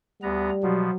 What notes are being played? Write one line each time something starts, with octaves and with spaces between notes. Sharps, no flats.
D2 G3 B3 A#5
B2 F3 F#3